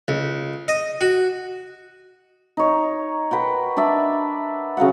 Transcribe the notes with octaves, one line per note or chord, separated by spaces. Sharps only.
C#2
D#5
F#4
D#4 C#5
A#4 B4 F#5 G5
D4 D5 E5
C#3 F#3 F5 F#5